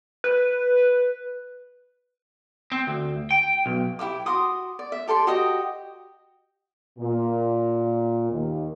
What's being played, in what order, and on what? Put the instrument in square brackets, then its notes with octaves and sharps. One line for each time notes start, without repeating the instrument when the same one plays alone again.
[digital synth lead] B4
[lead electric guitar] C4
D2
G5
B1
[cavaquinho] E4 G4 E5 D6
F#4 C6 D6 D#6
D5
E5
G4 A4 D5 C6
F#4 G4 D#5 G5
[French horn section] A#2
D#2